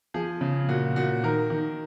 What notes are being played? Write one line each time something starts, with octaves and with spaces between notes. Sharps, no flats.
F3 G#4
C#3
A#2 F#4
A#2 F#4
D#3 A#4
D#3